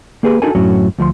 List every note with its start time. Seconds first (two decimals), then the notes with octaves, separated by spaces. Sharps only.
0.23 A#3 G4 G#4 B4
0.42 D4 D#4 F#4 A4 A#4 G#5
0.55 F#2 A2 F#3 C#4 F#4
0.99 D2 F3 D#5 C6